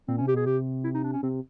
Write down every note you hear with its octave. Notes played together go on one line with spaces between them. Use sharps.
A#2 C4
C#4
C3
G4
B2 G#4
C3 G4
E4
D#4
D4
C#4
C3 C4